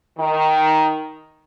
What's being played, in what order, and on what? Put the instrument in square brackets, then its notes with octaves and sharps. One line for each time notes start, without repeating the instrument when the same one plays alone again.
[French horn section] D#3